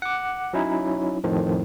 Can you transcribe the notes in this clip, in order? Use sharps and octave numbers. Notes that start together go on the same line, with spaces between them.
F#5 D6
F#3 C#4 D#4 E4
F2 A2 D#3 F3